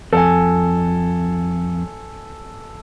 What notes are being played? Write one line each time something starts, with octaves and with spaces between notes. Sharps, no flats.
F2 A4 G#5